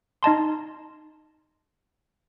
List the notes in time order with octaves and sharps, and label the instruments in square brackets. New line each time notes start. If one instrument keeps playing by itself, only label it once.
[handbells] D#4 D#5 A5 C6